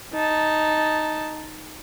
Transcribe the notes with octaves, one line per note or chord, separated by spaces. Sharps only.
D#4 A5